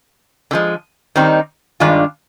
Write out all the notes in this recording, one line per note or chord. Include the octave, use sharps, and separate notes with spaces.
D3 F3 G#3
D#3 G3 C4 D#4
G2 D#3 G#3 D4 F4